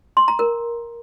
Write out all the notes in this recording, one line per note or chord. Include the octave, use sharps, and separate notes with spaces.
C6
A#5
A#4